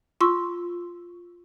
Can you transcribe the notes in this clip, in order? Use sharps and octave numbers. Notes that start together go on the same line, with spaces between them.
F4 C6 C#6 E6